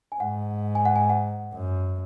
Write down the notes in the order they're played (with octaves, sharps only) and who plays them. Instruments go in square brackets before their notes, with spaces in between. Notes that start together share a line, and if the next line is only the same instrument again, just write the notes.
[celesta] G#5
[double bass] G#2 [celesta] F#5
[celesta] G#5
F#5
G#5
F#5
[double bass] F#2